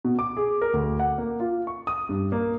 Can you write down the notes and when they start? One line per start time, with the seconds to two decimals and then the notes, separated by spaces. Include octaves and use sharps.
0.04 B2
0.19 D6
0.37 G#4
0.62 A#4
0.73 D2
1.00 F#5
1.18 A#3
1.40 F4
1.67 C#6
1.87 D#6
2.09 G2
2.32 A#3